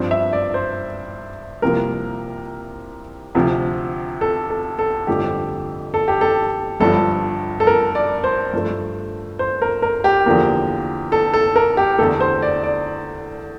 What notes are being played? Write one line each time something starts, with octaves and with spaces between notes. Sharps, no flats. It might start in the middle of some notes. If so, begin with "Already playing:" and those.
Already playing: G2 F3 C4
E5
D5
C5
C2 C3 F3 A#3 A#4
D2 C3 F3
A4
A4
A4
G1 F2 D3 F3 A3 G4
A4
G4
A4
G1 G2 F3 A4
A4
A#4
D5
C5
G2 F3 A3
C5
A#4
A#4
G4
E2 D3 F3 A#3
A4
A4
A#4
G4
E2 D3 A3 A4
C5
D5
D5